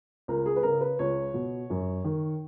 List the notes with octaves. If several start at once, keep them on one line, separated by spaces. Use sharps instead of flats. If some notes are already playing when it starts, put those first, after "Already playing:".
C#2 A#4
G#4
B4
C#3 A#4
B4
C#2 C#5
B2
F#2
D#3